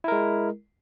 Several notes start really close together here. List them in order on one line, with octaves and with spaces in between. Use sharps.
E4 A#4 G#3